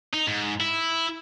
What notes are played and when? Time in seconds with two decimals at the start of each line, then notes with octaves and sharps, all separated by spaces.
0.14 D#4
0.28 G#2
0.60 E4